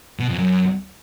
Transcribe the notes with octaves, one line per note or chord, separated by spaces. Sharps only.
B2
F2
F#2